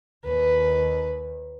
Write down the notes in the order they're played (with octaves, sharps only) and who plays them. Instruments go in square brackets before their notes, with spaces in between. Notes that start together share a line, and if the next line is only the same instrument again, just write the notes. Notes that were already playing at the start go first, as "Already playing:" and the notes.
[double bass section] D#2 D#3 [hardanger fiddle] B4